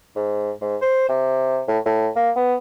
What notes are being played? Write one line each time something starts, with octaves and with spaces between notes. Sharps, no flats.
G#2
G#2
C5
C3
A2
A2
A#3
B3